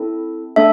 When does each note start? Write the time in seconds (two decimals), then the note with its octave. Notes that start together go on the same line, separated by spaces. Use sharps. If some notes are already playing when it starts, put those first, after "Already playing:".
Already playing: C4 E4 A4
0.56 A3 D4 A4 E5